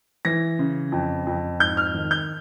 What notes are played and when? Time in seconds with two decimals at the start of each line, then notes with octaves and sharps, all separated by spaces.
0.25 E3 A#6
0.59 C#3
0.92 F2
1.27 F2
1.60 G#2 G6
1.77 F6
1.95 D#3
2.11 G6